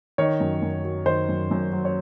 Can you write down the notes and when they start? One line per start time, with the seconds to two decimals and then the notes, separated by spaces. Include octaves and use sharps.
0.18 D#3 C#5
0.40 F#2
0.62 F#2
0.84 F#3
1.06 D#3 C5
1.28 F#2
1.51 F#2
1.73 F#3
1.85 C#5